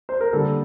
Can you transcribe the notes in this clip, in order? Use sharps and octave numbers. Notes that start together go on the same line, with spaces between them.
C5
A#4
D3 G3 A#3 A4